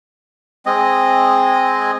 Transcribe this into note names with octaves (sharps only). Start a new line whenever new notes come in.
G#3 C4 D#5